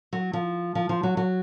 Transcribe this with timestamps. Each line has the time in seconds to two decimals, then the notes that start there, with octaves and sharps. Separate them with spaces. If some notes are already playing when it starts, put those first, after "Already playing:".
0.13 F#3
0.33 F3
0.75 F3
0.89 F3
1.03 F#3
1.17 F#3